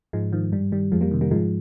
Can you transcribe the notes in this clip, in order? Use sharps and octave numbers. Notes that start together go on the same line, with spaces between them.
G#2 F3 G#3
D#3 F3
G2 G3
D#3 G3
F2 F3 G#3
G3 A#3
C3 D#3
G3 A#3
G#2 F3 G#3